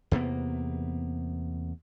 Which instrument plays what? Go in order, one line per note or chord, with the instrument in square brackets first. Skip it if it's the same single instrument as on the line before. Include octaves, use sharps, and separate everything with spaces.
[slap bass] E2 C3 A#3 B3